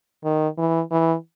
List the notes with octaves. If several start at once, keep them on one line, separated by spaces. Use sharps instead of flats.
D#3
E3
E3